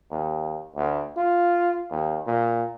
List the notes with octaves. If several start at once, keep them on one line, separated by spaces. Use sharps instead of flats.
D#2
D2
F4
D#2
A#2